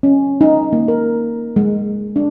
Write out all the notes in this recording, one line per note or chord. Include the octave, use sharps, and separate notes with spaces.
C#4
D#4
A#3
A#4
G#3
D4